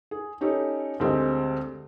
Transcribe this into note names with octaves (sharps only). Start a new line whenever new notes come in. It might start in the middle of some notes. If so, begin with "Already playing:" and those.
G#4
C#4 D#4 G4 A4
D2 G#3 C4 G4 D#5